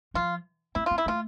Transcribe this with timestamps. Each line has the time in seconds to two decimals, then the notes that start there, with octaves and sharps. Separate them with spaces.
0.14 F3 F4
0.75 C4 E4
0.86 C4 F4
0.98 E4
1.06 A3 F4